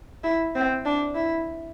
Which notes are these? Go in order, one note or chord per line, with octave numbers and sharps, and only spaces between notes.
E4
C4
D4
E4